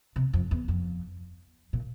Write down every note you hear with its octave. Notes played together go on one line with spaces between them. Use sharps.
C3
F2
E2
F2
A#2